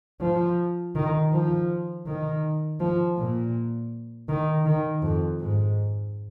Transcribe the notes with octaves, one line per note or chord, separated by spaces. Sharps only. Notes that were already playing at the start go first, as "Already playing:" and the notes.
F3
D#3
F3
D#3
F3
A#2
D#3
D#3
F2
G#2